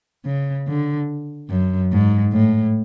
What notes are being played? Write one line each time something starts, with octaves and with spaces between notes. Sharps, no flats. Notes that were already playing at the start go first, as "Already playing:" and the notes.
C#3
D3
F#2
G#2
A2